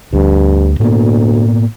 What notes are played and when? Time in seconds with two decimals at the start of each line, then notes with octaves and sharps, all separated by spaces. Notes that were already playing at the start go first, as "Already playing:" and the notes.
0.13 D2 G2
0.80 D2 A2 A#3 B3